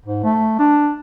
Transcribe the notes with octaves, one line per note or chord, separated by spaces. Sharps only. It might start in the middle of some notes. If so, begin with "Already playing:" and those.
G#2
A3
D4